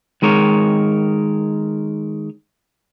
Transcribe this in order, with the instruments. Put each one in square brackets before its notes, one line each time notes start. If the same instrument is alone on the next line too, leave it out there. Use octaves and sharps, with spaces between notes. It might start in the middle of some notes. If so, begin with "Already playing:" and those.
[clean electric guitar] D#3 G#3 A#4 C#5